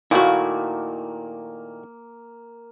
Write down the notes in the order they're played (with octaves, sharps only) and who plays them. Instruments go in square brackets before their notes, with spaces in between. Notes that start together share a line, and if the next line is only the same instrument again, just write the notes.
[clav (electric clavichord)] A#2 D#3 A3 [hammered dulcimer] A#3 [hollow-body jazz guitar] E4 F#4